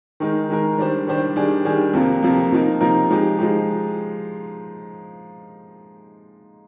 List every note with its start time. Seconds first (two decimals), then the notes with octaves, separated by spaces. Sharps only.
0.20 D#3 G#3 D#4 A#4
0.49 D#3 G#3 D#4 A#4
0.78 D#3 G3 D4 G4 C5
1.07 D#3 G3 D4 G4 C5
1.36 D#3 G3 D4 G#4
1.65 D#3 G3 D4 G#4
1.93 F2 C3 F3 A#3
2.23 F2 C3 F3 A#3
2.51 C3 F3 A#3 D#4 A#4
2.81 C3 F3 A#3 D#4 A#4
3.10 F3 G#3 D#4 G4
3.38 F3 G#3 D#4 G4